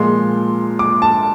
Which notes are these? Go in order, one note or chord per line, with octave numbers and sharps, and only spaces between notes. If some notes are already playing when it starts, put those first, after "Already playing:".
Already playing: A#2 F3 G#3 C6
D6
A5